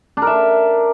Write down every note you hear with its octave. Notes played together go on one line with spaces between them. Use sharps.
D4 A#4 E5